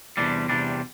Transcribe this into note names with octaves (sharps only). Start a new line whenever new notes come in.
E2 C3 G3 D4
E2 C3 G3 D4